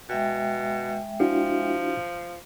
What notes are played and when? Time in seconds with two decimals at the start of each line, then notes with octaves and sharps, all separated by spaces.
0.09 B2 G#3 E5 G5
1.20 F3 D4 E4 F#4